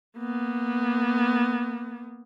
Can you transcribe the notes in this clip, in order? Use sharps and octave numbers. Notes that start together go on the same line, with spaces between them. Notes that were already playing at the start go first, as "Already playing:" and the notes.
A#3 B3